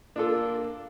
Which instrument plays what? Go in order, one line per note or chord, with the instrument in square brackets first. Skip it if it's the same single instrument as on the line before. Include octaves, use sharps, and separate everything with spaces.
[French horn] A#3 [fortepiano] D4 F4 A4